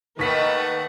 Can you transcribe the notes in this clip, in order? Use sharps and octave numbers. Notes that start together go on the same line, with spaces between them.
D#2 D#3 A3 B4 F#5 B6